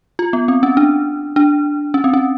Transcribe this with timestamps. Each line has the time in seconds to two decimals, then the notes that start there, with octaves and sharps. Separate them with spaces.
0.19 F4
0.33 B3
0.48 C4
0.63 C#4
0.77 D4
1.36 D4
1.94 C#4
2.04 C4
2.14 C#4